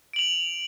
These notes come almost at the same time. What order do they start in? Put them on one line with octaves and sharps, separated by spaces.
D7 F#7 F7